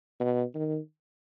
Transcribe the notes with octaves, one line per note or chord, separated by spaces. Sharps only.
B2
D#3